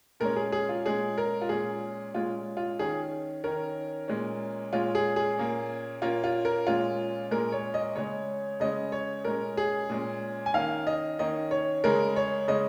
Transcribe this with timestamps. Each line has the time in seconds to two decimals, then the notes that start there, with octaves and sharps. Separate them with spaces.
0.20 A#2 G#3 C#4 A#4
0.36 G#4
0.52 G#4
0.69 F4
0.85 A#2 G#3 C#4 G#4
1.18 A#4
1.41 F4
1.49 A#2 G#3 C#4 G#4
2.14 A#2 G#3 C#4 F4
2.57 F4
2.79 D#3 C#4 G#4
3.44 D#3 C#4 A#4
4.08 A#2 G#3 C#4
4.73 A#2 G#3 C#4 F4
4.95 G#4
5.16 G#4
5.38 A#2 A#3 C#4
6.02 A#2 A#3 C#4 F4
6.24 F4
6.45 A#4
6.67 A#2 G#3 C#4 F4
7.31 A#2 G#3 C#4 A#4
7.52 C#5
7.74 D#5
7.96 C#3 G#3 C#4 C#5
8.60 C#3 G#3 C#4 D#5
8.92 C#5
9.25 A#2 G#3 C#4 A#4
9.57 G#4
9.90 A#2 G#3 C#4
10.46 G#5
10.54 D#3 A#3 C#4 F5
10.87 D#5
11.19 D#3 A#3 C#4 D#5
11.51 C#5
11.84 C#3 G#3 C#4 A#4
12.16 C#5
12.48 C#3 G#3 C#4 D#5